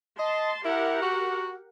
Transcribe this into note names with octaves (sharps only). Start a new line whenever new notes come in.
D#5 A5 C6
E4 G4 A#4 F#5
F#4